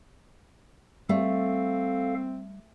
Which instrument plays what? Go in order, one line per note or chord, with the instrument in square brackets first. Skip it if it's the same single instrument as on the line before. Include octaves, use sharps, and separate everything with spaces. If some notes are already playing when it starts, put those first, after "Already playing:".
[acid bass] G3 [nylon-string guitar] A3 [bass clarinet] C4 [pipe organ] A4 F5